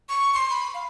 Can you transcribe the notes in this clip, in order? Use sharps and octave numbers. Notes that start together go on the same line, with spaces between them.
C#6
C6
B5
F5